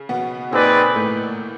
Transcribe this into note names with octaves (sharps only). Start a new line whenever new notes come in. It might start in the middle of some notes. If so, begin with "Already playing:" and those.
Already playing: C#3
B2 B3
A#2 A#3 C4 D#4 G#4 B4 D5
A2 A3